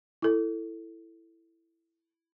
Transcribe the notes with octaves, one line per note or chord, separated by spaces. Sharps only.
E4 A4